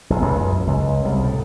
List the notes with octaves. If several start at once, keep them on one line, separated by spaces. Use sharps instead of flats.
B1
C#2
F#2
C#2
C2
A2